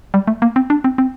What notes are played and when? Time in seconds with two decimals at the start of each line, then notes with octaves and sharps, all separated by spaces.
0.14 G3
0.28 A3
0.42 A#3
0.56 C4
0.70 D4
0.84 C4
0.98 C4